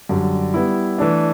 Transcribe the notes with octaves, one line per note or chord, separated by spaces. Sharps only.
F#2 D3 G3
G3 B3 E4
E3 A3 D4